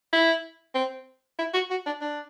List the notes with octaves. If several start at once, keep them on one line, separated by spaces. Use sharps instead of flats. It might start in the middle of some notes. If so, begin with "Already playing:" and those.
E4
C4
E4
F#4
F#4
D4
D4